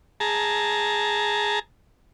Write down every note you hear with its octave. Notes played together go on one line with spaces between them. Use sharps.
G#4 A5 A#5